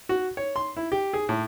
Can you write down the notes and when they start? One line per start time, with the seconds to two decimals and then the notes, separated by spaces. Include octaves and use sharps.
0.09 F#4
0.37 C#5
0.56 C6
0.77 E4
0.92 G4
1.13 G#4
1.29 A2